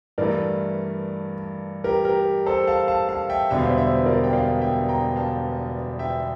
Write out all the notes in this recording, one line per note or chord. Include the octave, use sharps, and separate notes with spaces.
G2 E3 A3 A#4 D5
G4 A#4
G4 A#4
A4 C5
F5 A5
F5 A5
F5 A5
E5 G5
E1 E2 D3 G3 E5
F5
C5 E5
C5 E5
A#4 D5
G5
D5 F5
E5 G5
G5 A#5
F5 A5
E5 G5